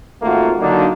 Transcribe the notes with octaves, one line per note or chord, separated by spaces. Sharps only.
G#1 A3 A#3 F4 F#4
D3 F#3 A#3 D4 D#4